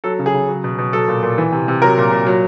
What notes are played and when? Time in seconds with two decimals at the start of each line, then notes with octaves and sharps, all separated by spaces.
0.04 F#3 A4
0.19 C#3
0.26 G#4
0.34 C#3
0.49 F#3
0.64 B2
0.78 B2
0.93 F#3 A4
1.08 A#2
1.23 A#2
1.38 E3
1.52 C3
1.68 C3
1.82 F#3 A#4
1.98 A#2
2.12 A#2
2.26 F#3